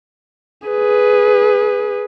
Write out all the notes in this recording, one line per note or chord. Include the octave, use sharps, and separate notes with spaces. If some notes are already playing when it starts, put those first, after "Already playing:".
G#4 B4